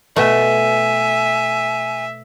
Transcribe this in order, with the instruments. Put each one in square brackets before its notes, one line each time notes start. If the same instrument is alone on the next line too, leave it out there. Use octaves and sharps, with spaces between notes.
[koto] B2 A3 [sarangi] E5 [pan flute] G#5